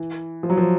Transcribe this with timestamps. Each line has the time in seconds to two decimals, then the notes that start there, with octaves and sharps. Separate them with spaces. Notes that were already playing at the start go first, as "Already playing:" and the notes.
Already playing: E3
0.43 F3
0.50 F#3
0.57 F3